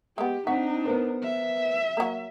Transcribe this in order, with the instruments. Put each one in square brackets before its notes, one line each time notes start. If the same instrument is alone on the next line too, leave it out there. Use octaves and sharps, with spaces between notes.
[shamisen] G#3 B3 [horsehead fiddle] G4
[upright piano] C4 B6 [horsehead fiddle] D4 D#4 [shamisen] F#4
[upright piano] B3 A#4 C5
[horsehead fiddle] E5
[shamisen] F#3 A#3